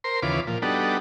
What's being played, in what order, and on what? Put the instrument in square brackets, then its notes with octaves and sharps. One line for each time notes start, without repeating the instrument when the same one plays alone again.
[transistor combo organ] A#4 C5 C6
D#2 C#3 E3 F4 B4 D6
A#2 F3
G3 B3 D4 D#4 F#4 A4